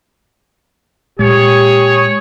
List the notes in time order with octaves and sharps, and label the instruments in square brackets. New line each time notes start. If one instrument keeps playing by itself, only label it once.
[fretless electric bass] A#2 G#3 [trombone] G4 [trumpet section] G#4 C#5